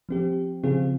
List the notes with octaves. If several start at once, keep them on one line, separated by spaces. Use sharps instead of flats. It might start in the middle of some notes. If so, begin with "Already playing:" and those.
F3 C4 G4
C#3 F3 C4 F4 G#4